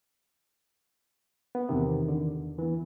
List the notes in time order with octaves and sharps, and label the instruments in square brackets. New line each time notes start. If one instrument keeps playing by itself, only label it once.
[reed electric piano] B3
[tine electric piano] E2 D#3 [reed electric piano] C3
[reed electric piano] D3
[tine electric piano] E3 B3